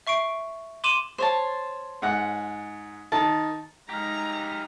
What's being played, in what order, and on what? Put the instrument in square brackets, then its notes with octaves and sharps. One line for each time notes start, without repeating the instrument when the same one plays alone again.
[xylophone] E5 C#6 C7 D7
C6 D6 D#7 E7 F#7
[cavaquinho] C5 C#5 A5
[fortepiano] G#2 F#5
[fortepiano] D#3 [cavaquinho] A5
[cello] G#3 D#4 [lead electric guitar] G4 F5 [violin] A#5